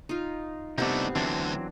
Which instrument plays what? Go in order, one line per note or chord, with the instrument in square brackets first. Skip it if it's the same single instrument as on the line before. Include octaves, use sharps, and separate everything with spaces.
[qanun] D#4 F4
[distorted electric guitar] C2 A3 [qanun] C3 B3 [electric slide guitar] D4 D#4
[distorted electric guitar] D2 D3 [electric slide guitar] E3 F#3 C4 [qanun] D4